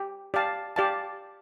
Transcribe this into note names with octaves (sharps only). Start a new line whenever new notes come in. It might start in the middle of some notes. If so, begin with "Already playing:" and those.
Already playing: G4
G4 D5 F5 A5
G4 D5 F5 A5